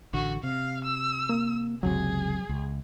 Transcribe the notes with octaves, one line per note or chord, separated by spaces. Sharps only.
A1 D3 F#4
C3 F5
E6
A#3
F#1 C#2 C3 F#3 G#4
C#2